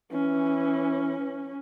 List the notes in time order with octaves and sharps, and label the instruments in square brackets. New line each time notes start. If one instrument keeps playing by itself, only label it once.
[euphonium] E3 [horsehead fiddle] C#4